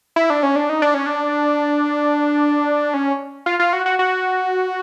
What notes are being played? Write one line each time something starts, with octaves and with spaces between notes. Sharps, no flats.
E4
D4
C#4
D4
D#4
D4
C#4
D4
C#4
F4
F4
F#4
F#4
F#4